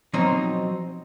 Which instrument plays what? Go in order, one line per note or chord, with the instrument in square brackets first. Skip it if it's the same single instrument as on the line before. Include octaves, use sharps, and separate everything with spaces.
[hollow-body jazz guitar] B2 F3 F#3 C4 D#4